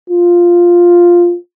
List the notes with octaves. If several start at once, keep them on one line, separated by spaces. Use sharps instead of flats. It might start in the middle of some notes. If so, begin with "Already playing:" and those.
F4